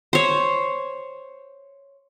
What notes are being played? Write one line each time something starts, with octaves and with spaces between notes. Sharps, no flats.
C5 C#5